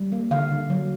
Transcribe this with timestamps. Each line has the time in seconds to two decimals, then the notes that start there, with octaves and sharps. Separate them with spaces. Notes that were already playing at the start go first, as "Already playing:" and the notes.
Already playing: G3
0.12 A#3
0.31 D3 F5
0.51 D3
0.70 F#3